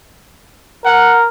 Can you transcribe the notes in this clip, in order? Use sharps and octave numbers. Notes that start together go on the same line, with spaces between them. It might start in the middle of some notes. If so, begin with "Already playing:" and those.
A#4 F#5